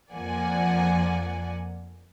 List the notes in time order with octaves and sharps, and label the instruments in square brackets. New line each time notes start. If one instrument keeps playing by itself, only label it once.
[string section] F2 F3 A#3 D5 F#5 G#5